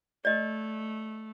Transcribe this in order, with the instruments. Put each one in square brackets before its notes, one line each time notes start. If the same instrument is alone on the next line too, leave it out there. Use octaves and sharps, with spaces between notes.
[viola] A3 [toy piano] D5 D#5